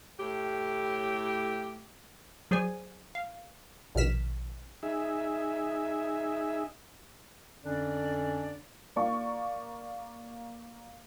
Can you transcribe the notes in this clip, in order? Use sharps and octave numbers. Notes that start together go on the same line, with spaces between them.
A2 G4
F#3 G#4 C5 D5 G#5
F5
A#1 B2 D#3 F6 B6 E7
D#4 G#4 E5
F2 D3 C#4 D4 D5
A#3 D5 C#6